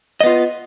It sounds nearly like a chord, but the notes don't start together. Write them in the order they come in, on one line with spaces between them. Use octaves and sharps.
D#5 B3 F4